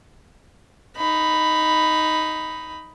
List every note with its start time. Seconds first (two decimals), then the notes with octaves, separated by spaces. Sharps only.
0.97 D#4 B5